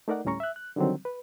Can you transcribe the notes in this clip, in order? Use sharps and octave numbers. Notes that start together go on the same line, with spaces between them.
A3 D#4 A#4 D5 F#5
D2 A2 G3 C#4 A#5 C#6
E5 F#6
F#6
D3 D#3 F#3 G3 C4
B4